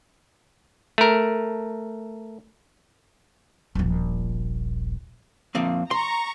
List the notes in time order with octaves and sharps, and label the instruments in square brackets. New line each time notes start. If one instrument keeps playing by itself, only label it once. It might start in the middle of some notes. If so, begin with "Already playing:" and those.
[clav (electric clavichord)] A3 A#4
[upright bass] D#1 A#1
[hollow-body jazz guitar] F3 A#3 C4
[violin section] A#5 C#6 [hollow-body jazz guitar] C6